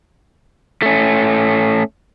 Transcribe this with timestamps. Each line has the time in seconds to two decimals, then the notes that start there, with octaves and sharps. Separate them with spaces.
0.82 A3 C#4